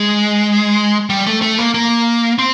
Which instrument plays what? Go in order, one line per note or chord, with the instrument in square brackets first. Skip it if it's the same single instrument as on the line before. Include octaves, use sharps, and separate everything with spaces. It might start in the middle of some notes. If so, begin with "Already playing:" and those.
Already playing: [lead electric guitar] G#3
G3
A3
A3
A#3
A#3
C4